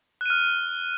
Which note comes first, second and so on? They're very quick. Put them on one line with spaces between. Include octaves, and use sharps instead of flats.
F#6 D#7 F6